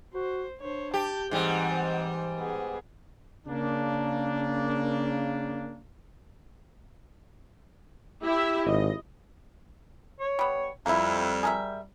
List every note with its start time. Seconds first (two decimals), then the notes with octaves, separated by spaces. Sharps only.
0.14 F#4 C5
0.60 D4 C5 C#5
0.94 G4 A5
1.31 G#2 E3 G3 C4 F#5
2.37 B3 G#4
3.47 C#3 A#3 D4
8.22 E4 G4 E5
8.66 G#1 D#5
10.19 C#5
10.39 G3 B3
10.86 F2 G3 A#3 E4
11.43 G#4 A#4 E5